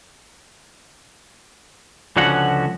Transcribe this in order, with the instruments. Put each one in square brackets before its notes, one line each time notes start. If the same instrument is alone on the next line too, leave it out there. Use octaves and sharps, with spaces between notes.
[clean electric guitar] C#2 D3 F3 C#4 F#4 F#5